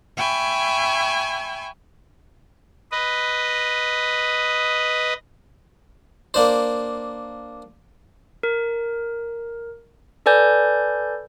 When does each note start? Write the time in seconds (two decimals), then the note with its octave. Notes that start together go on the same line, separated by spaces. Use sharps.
0.17 E5 G5 G#5 B5 C#6
2.92 B4 D#5
6.34 A#3 D4 C5
8.43 A#4
10.26 A4 B4 D5 G#5 G6